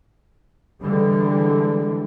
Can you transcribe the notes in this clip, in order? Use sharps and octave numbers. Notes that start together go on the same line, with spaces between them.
D3 E3 G3 G#3